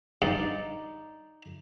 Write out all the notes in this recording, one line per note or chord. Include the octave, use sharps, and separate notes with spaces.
G2 D#4 D5